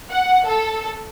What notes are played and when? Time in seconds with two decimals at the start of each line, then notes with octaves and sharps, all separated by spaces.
0.10 F#5
0.46 A4